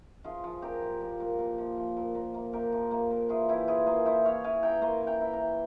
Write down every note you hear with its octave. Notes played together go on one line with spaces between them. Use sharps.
F3 F4 G#4
F3
A#2 G4 A#4
F3
A#2
A#2
A#2
F3
F3
A#2
A#2
A#3
A#2 G4 A#4
F3
A#3
A#2
E3 F4 G#4
E3 E4 G4
E4 F4 G#4
A#3 G#4 C5
E4 C5 E5
E3 C#5 F5
E3 F5 G#5
E4 G5 A#5
A#3 G#5 C6
E3
G5 A#5
E4
G5 A#5
E3